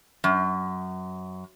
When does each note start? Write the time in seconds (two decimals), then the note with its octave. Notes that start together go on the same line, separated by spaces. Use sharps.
0.24 F#2